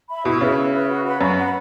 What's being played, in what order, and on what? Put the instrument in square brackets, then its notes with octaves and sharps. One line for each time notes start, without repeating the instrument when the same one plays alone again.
[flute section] E5 B5
[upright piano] B2 [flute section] E4
[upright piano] C#3 [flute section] B4 E5
[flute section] E4
B4 E5
F#4
B4 F#5 B5
[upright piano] F#2 [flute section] F#4
[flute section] B4 F#5 B5